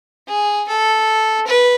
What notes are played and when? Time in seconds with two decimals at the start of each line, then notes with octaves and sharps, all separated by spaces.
0.27 G#4
0.67 A4
1.46 B4